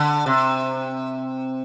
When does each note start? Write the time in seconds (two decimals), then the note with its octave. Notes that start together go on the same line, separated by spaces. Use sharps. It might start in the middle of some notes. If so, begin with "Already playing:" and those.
Already playing: D3
0.26 C3